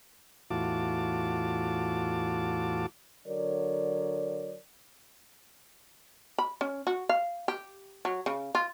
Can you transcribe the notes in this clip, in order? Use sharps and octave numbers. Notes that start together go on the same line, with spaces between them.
E2 A2 F4 F#4 A5 D6
D3 F#3 A#4 C#5 D5
B5
C#4
F#4
F5
G4
F#3
C#3
F4